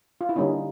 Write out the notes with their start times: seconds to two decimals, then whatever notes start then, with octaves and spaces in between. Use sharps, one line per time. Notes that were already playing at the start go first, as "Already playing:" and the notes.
0.21 F4
0.29 E4
0.36 D3 G3 A#3 C#4 D#4